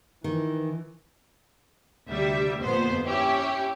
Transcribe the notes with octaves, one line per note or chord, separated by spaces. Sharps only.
D#3 E3
D2 C3 G3 E5
G1 F2 A#2 B3 C5
C#4 E4 G4 C#5